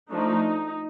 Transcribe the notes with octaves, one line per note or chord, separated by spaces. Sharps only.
F3 A3 D4 D#4